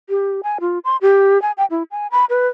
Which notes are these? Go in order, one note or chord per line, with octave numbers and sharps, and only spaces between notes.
G4
G#5
F4
C6
G4
G#5
G5
E4
G#5
B5
B4